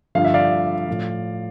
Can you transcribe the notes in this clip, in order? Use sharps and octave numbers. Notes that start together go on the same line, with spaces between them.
G2 D3 F3 F5
E5
D5 F5
A2 F3